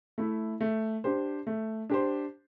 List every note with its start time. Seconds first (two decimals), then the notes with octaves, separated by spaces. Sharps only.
0.18 A3 E4
0.61 A3
1.04 D4 G4 C5
1.47 A3
1.90 D4 G4 C5